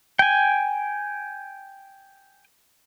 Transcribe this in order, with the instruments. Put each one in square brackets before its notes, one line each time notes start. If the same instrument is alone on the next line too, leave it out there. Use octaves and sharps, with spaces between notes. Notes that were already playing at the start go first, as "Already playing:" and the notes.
[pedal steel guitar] G5 G#5